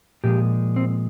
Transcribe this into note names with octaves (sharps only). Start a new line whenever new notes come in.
A#2 F3 G#3 G4
C4